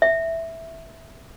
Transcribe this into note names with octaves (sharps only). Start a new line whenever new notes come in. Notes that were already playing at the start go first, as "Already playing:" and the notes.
E5